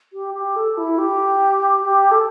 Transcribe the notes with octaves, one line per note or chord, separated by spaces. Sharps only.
G4
G4
A4
E4
G4
G4
A4